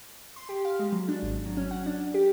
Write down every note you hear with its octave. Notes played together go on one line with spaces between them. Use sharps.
C6
G4
F5
G#3
F#3
D4
G#1
F#3
C#4
F#5
D4
G4